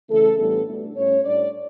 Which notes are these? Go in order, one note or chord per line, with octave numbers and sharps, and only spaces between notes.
C#3 E3 A3 A4
A2 E3 G3 B3 D4 A4
B2 A3 D4
A2 G3 C#4 C#5
A2 G3 D4 D5